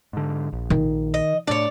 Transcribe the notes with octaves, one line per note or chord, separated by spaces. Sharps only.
G#2 D3
A#1
D#3
D#5
A2 D4 C#5 D5